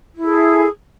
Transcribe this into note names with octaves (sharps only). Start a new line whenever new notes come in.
E4 G#4 A4